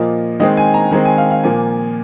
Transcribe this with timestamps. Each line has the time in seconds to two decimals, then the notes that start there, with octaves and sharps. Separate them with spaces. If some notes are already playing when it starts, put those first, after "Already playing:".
Already playing: A#2 F3 A#3 D#5
0.40 D#3 G#3 C4 D#5
0.57 G#5
0.74 A#5
0.91 D#3 G#3 C4 A#5
1.05 G#5
1.18 F5
1.31 F5
1.44 A#2 F3 A#3 G#5